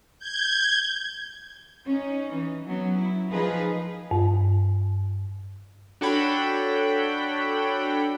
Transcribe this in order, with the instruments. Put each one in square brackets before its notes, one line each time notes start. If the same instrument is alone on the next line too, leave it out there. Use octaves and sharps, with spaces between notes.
[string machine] G6 G#6
[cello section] C#4 D#4
E3
F#3 B3 C#4
E4
F3 D#4 G#4 A#4 B4 F5
[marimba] G2
[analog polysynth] D4 F#4 A4 C#5 G5 B5